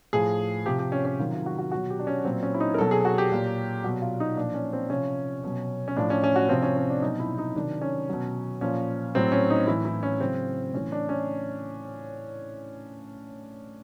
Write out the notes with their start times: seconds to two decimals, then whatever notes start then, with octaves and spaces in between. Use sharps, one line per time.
0.13 A2 F3 G#4
0.65 C3 F3 G4
0.79 G4
0.92 C#4
1.05 C#4
1.19 C3 D#3 F#3 F4
1.33 F4
1.46 F#4
1.59 F#4
1.72 B2 F#3 F#4
1.90 G4
1.99 D4
2.07 C#4
2.25 A#2 F#3 C4
2.43 C#4
2.54 E4
2.60 D#4
2.74 A#4
2.78 B2 F#3 A4
2.91 G#4
3.05 F#4
3.18 G4
3.32 A#2 F#3
3.84 B2 F#3 F#4
4.02 F4
4.20 D#4
4.37 A#2 F3 D4
4.54 C#4
4.73 C4
4.90 C3 F3 C#4
5.44 B2 F#3
5.88 C#4
5.96 A2 F3 D4
6.10 C#4
6.24 C#4
6.36 F#4
6.49 C3 F3 C4
6.62 C#4
6.76 C#4
6.90 D4
7.02 B2 F#3 D#4
7.20 E4
7.38 D#4
7.55 C3 D#3 F#3 D4
7.82 C#4
8.09 B2 F#3
8.61 A#2 F3 C#4
9.15 A2 F#3 C4
9.32 C#4
9.50 D#4
9.67 A2 E3 E4
9.85 E4
10.03 C#4
10.20 C#3 F#3 C4
10.73 A2 E3 C#4
10.92 D4
11.09 C#4